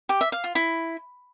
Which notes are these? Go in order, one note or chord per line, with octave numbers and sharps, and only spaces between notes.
G4
E5
F5
F4
E4